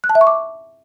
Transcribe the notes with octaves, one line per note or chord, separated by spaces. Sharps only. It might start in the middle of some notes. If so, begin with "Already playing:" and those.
F#6
A5
E5
C#6
D6